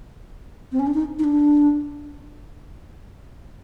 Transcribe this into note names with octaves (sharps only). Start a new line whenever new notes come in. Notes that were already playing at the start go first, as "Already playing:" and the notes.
C4
C#4
D4
D#4
D#4
D4